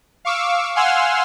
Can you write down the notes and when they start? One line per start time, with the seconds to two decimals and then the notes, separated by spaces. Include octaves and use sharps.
0.25 F5 C#6 D6 E6
0.75 F5 F#5 G#5 C6 E6 F6